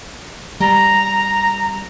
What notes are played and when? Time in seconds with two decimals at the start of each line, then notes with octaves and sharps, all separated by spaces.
0.61 G3 A#5